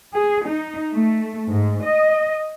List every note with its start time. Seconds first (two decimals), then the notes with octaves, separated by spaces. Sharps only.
0.12 G#4
0.44 D#4
0.93 A3
1.49 G#2
1.84 D#5